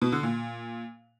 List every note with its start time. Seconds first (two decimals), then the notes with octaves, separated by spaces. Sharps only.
0.02 B2
0.12 D3
0.23 A#2